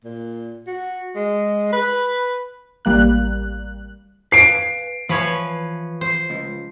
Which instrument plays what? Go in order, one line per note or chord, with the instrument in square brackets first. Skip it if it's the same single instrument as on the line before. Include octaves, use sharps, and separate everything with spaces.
[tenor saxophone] A#2
F#4
G#3
B4
[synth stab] A1 G3 A#3 F#6
[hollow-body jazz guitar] B4 F5 G#5 [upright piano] C7 D7
[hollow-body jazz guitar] E3 G#5 [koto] F3 B4 C#5
[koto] C5
[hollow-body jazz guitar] C#2